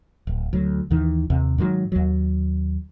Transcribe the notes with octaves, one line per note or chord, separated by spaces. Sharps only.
D1
D2 F#3
D#2 D#3 E3
D#2 C3
G#2 D#3 F3 F#3
D#2 F#3